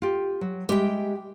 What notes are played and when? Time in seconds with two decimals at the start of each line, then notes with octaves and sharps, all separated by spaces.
0.02 F4 G4
0.41 F#3
0.69 G3 G#3 G4 E5 G5